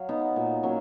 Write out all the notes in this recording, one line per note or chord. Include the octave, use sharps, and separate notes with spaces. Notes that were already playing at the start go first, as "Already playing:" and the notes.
Already playing: F#3 F5
B3 D#4
A#2
F#3 A#3 C#4